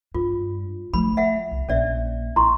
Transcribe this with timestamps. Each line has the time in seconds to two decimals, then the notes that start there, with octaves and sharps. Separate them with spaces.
0.14 G2 F4
0.94 F3 A3 B5
1.17 E5 F#5
1.51 C2
1.69 A#1 C#4 D5 E5
2.36 A1 E4 A#5 C6 C#6